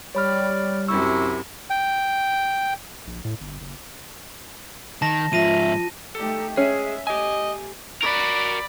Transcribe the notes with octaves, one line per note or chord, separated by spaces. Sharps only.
G3 C#5 D5 B5 F6
F#2 C3 E4 C#6 E6
G5
A#1
A2
G1
F#1
D#3 A5 A#6
G#2 F3 F4 E5 A#6 D#7
A3 D#4 G4 A4
G#3 C#4 G#4 E5
A3 G4 D#5 G#5
F#4 A#4 D5 B5